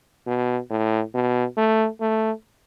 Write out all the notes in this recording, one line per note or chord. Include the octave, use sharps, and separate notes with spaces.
B2
A2
B2
A3
A3